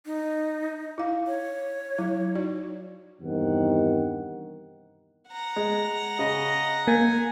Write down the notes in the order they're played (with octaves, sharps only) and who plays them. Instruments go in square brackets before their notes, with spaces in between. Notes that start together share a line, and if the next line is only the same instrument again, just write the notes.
[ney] D#4
[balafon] E4 F5
[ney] C#5
[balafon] F#3 E4
D#4 F#4 D5
[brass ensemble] E2 G2 C3 D#3 F#5
[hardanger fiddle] F#5 A#5
[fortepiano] G#3
[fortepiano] C#3 [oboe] D#5
[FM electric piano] A#3 [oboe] G#5